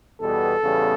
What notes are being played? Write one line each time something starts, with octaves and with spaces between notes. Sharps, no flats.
E2 B2 G3 B3 A4
E2 C#3 G3 B3